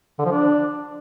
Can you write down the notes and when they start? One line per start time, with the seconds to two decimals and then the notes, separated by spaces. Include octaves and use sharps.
0.19 D3
0.25 F3
0.32 D4